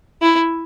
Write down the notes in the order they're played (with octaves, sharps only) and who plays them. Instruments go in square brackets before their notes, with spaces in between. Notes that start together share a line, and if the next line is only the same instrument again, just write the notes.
[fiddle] E4